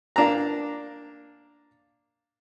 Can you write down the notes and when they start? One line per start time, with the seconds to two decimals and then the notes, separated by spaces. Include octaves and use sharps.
0.16 A#3 D4 A#5